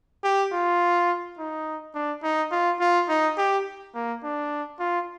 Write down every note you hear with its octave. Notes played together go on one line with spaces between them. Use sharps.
G4
F4
D#4
D4
D#4
F4
F4
D#4
G4
A#3
D4
F4